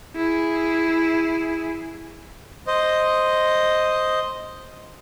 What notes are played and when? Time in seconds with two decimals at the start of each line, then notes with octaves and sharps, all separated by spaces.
0.16 E4 G#4
2.67 C5 D#5